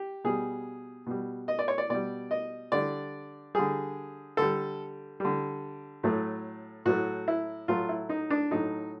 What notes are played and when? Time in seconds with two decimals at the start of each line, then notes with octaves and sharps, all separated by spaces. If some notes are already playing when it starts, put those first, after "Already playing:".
Already playing: G4
0.24 B2 G3 G#4
1.06 B2 G3
1.48 D#5
1.59 D5
1.68 C#5
1.78 D5
1.89 B2 G3 D5
2.31 D#5
2.72 D3 G3 D5
3.55 D3 G3 G#4
4.37 D3 G3 A4
5.20 D3 G3
6.03 A2 F#3 A3
6.85 A2 F#3 A3 F#4
7.28 E4
7.68 A2 F#3 A3 F4
7.89 E4
8.09 D#4
8.30 D4
8.51 A2 F#3 A3 D#4